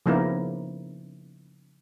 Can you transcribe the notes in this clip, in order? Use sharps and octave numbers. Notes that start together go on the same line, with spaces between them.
C#3 F3 A#3 B3 D#4 E4